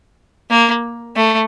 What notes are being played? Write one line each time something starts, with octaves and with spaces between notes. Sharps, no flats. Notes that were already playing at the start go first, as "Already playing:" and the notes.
A#3
A3